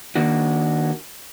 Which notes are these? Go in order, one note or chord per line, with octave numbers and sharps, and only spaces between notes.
D#3 A#3 D4 F#4